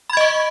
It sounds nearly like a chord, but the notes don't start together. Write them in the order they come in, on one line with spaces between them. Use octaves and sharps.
B5 G#6 D#5 C#6